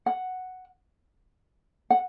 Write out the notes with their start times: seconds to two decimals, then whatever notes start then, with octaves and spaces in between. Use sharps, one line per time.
0.06 F#5
1.90 F#5